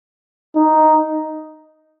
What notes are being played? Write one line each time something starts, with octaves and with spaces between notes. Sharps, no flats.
D#4